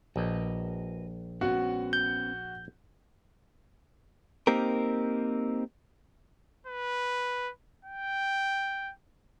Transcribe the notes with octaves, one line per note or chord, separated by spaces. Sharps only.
A#1 F#4 B4 D#5
B3 C#4 F#4 F#5
G6
A#3 C4 D#4 G4 A#4
B4
G5